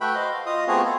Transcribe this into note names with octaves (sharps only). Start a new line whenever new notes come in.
A3 F#4 B4 E5 G5 B5
C5 D#5 F5
F5
F4 D#5 D#6
A3 B3 C4 F4 F#4 G#4
A4